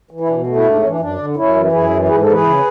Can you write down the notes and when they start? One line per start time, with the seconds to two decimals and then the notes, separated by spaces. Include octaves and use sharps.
0.11 E3
0.20 E4
0.28 B2 D4
0.47 A3
0.56 E4
0.65 G#2 D4
0.77 C#4
0.83 E3
0.89 D4
1.00 F#2 D4
1.19 D3
1.36 F#2 C#4 E4
1.54 E3
1.72 F#2 E4 G#4
1.90 E3
2.08 G#2 G#4 B4
2.21 E3 A4
2.32 G#4 B4
2.44 C#3